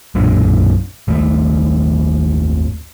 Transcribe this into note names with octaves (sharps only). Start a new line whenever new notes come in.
B1 F#2 A#2 D4
G#1 D#2 A3